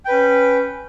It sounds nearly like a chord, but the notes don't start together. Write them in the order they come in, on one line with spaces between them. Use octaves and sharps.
G5 B4 C#4